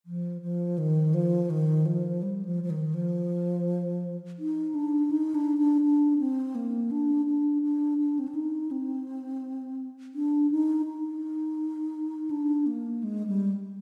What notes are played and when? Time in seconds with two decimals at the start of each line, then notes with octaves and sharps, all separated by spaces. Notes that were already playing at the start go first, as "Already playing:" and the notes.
0.06 F3
0.42 F3
0.78 D#3
1.14 F3
1.50 D#3
1.86 F3
2.22 G3
2.45 F3
2.63 F3
2.70 D#3
2.94 F3
4.39 D#4
4.75 D4
5.11 D#4
5.35 D4
5.58 D4
5.82 D4
6.18 C4
6.55 A#3
6.91 D4
7.26 D4
7.63 D4
7.98 D4
8.19 C4
8.28 D4
8.35 D#4
8.71 C4
10.15 D4
10.51 D#4
10.87 D#4
12.31 D4
12.67 A#3
13.03 G#3
13.27 G3